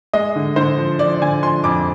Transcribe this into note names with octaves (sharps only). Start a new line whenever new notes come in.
G#3 D#5
D3
D3 C5
F3
F3 D5
D3 G#5
F3 C6
F2 D6